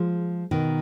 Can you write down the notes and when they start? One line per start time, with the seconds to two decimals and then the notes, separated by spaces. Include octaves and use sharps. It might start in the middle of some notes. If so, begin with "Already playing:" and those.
Already playing: F3 G#3
0.51 B2 D#3